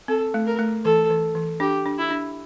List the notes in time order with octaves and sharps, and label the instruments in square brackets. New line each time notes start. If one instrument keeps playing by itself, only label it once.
[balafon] C4 [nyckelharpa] A4
[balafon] A3
[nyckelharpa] A#4
[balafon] A3
[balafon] E3 [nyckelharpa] A4
[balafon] E3
E3
[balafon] D4 [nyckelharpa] G4
[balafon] D4
[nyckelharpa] E4
[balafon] D4